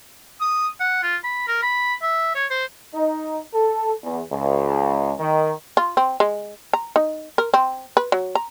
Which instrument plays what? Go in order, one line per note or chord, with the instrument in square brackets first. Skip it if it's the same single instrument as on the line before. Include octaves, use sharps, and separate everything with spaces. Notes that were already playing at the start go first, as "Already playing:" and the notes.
[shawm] D#6
F#5
F4
B5
A#4
B5
E5
C#5
C5
[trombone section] D#4
A4
E2
C#2
D#3
[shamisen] F4
C4
G#3
A#5
D#4
A#4
C4
B4
F#3
A#5